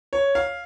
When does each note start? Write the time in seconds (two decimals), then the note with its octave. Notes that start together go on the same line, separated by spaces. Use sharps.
0.13 C#5
0.35 F5